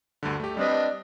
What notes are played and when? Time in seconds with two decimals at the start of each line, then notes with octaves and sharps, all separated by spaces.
0.23 D2 G2 D3
0.40 A3 G4
0.57 G3 C4 D4 B4 D#5